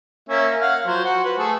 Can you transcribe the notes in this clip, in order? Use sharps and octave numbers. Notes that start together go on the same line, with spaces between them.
A#3 C#4 E5
F5 F#5
F3 F#3 C5
F#4
B4
A3 G#4 A4